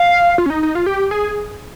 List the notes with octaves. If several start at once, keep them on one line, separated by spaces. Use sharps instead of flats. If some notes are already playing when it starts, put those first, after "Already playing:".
Already playing: F5
F4
C#4
D#4
D#4
F4
G4
G#4